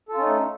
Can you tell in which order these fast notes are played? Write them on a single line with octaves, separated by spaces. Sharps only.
A4 F4 C#4 D#4 A3